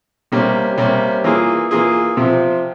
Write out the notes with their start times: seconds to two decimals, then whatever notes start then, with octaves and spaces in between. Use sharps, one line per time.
0.32 C3 G3 A#3 C#4
0.78 C3 G3 A#3 C#4
1.24 E3 A#3 F4 G#4
1.71 E3 A#3 F4 G#4
2.16 C3 F3 C4 G4